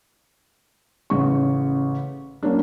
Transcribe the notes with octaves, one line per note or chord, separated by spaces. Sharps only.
A1 C#3 C#6
F#3 A#3 C#4 D4